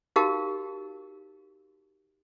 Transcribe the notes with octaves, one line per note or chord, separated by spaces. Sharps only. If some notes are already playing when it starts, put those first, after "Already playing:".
D#4 F#4 G4 A#4 F5 A5